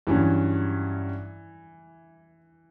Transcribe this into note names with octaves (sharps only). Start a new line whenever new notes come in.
G2 E3 F#3 C#4